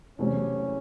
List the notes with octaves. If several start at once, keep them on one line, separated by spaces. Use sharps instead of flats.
E2 C3 F#3 A3 C4 C#4